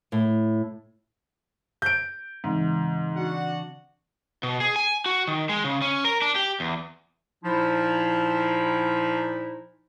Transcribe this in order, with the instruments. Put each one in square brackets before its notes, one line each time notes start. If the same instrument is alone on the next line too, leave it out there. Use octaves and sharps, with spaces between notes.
[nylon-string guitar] A2
[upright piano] G6 D7
[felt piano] G#2 [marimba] C#3 E3 C4
[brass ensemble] D4 F#4 F#5
[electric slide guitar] B2
G#4
G#5
F#4
D#3
G#3
C#3
C#4
A#4
D4
G4
E2
[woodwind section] A#2 F3 D#4 E4